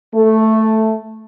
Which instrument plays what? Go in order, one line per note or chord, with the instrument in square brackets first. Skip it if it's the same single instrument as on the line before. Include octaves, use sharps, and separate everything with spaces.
[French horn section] A3